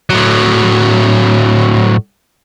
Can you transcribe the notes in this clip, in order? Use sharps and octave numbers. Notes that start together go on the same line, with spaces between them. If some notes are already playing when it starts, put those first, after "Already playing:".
A2 F#3